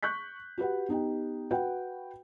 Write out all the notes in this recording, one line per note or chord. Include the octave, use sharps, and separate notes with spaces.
C#6 F#6 G6 B6
F#4 G4 B4 F#5
B3 D#4 G4 G5
F#4 B4 F#5 G5